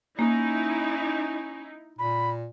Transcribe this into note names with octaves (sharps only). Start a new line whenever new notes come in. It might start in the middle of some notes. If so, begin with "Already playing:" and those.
A#3 C#4 D#4 E4
A#2 B5